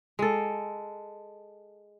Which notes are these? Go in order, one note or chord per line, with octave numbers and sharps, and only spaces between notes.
G#3 A4